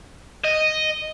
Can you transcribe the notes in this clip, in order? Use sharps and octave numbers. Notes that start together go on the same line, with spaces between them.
D#5